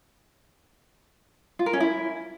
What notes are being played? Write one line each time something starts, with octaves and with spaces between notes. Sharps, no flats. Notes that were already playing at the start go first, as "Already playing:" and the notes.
F4
A#4
C#4
E4